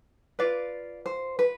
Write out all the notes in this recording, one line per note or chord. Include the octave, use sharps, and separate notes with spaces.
F4 B4 D5 F5
C5
B4